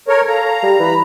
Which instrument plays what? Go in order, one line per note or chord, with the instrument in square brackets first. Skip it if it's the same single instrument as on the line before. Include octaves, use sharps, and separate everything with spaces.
[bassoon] A4 [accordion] A#4 C#5
[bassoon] A4 [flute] F5 [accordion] A#5
[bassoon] G3
[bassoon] E3 [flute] B5